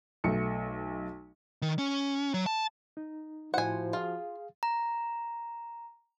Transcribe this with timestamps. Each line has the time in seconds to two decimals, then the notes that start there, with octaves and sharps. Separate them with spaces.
0.24 B1 A3 C#7
1.62 D#3
1.79 C#4
2.34 F#3
2.46 A5
2.97 D#4
3.54 A2 F3 E4 F#4 C5 F#5 G#5
3.93 F4 G#4 F5
4.63 A#5